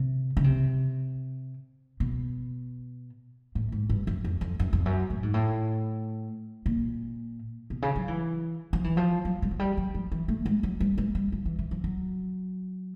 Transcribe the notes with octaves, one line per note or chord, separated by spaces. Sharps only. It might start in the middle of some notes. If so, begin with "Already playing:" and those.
Already playing: C3
C#3
C3
B2
A2
G#2
G2
F#2
F2
F2
F#2
F2
F#2
A2
G#2
A2
A#2
B2
C#3
F#3
E3
F3
E3
F3
F#3
G#3
F#3
G3
F#3
F3
E3
A3
G#3
F#3
G3
G#3
G3
F3
E3
E3
F3
F#3